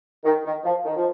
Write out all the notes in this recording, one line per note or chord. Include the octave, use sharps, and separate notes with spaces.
D#3
D#3
F3
D#3
F3